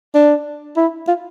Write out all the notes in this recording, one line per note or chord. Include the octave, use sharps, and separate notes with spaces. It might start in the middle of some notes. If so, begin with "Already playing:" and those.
D4
E4
F4